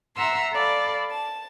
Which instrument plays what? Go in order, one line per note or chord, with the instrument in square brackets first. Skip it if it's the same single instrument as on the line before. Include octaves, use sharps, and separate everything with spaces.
[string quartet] E5 F#5 A#5 C6 E6
A4 D5 F5 B5
A5